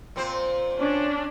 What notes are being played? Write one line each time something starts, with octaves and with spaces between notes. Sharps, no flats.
A#2 C4 C5
C#4 D4